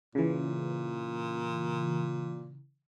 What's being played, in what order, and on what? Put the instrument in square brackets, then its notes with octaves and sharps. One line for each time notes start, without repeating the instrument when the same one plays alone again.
[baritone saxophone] A#2 [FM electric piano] C#3 E3